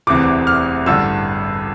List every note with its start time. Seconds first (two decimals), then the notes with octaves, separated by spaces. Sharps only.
0.07 E1 D2 C3 E3 D6
0.47 F6
0.86 A1 G2 D3 E6